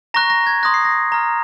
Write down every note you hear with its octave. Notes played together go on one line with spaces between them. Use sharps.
A#5 C#6 F#6 A#6
A#6
G#6
C6 D#6 F#6 A#6
C7
A#6
A#5 F6